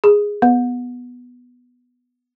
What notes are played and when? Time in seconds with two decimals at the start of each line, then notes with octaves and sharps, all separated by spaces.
0.04 G#4
0.42 B3